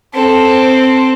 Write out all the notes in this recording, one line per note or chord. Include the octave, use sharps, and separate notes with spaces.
C4 A4